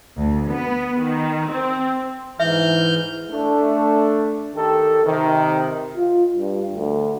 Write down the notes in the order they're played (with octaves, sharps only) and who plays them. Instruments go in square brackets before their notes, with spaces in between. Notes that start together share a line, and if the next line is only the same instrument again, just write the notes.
[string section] D2
B3
D#3
C4
[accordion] G#2 F6 G6 [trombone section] E3 [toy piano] E5
[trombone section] A3 D4
D#3 G4 A4
C3 D#3
[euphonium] F4
G2
D2